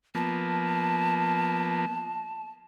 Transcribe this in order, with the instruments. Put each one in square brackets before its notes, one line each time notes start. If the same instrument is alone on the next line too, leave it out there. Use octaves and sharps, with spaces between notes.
[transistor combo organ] F3 A#3 B3 [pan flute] A5